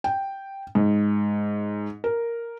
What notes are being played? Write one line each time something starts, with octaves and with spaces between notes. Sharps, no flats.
G5
G#2
A#4